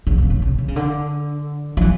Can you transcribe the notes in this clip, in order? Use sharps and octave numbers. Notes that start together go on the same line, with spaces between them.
C#3
C#3
C#3
C#3
D3
C#3
D3
F#3
E3